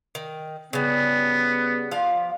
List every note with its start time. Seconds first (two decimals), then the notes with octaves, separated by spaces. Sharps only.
0.15 D#3
0.73 C#3 G3 B3
1.92 F3 D5 F5